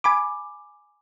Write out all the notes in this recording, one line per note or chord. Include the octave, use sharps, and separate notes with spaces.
G#5 B5 D6